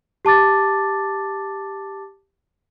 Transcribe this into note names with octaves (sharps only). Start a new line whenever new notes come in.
G4 A5 D6 A6